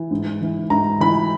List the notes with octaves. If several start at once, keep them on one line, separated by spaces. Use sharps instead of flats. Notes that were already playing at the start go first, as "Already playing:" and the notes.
Already playing: E3
G#2
E3
G#2 A#5
E3 B5